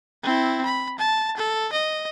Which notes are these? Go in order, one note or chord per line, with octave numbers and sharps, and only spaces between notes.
C4 E4
B5
A5
A4
D#5